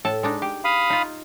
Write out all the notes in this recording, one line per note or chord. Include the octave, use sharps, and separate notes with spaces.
A2 A4 A5
G#3 D4 D#4
G4
F5 B5 D#6
D#4 F4